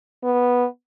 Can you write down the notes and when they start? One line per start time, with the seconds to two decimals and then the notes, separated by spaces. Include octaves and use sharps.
0.24 B3